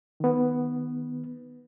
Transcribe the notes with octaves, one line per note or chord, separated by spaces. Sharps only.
D#3 B3